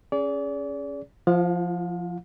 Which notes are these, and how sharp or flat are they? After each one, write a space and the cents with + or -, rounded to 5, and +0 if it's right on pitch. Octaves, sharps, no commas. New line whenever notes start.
C#4 +0 G#4 +0 D5 -35
F3 +0 F4 -45 F5 +40